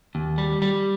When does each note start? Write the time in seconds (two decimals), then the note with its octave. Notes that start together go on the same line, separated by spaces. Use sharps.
0.15 D#2
0.38 G3
0.62 G3